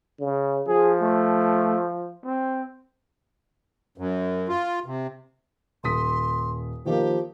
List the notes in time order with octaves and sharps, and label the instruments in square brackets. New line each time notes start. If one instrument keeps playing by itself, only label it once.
[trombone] C#3
[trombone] F3 [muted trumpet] G#4
[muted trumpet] A3
C4
[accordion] F#2
F4
C3
[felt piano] D#1 D#6 B6 [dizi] C6
[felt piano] D#3 A#3 [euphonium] F3 [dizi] G4